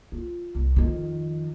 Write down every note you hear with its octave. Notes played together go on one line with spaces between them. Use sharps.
F4
C2
F2 D#3